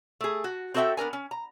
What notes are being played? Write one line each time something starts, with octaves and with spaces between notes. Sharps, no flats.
A3 G#4
F#4
C4 F#4 A4 D#5 E5 G5
B3 D4 A#4 G#5
C#4
A#5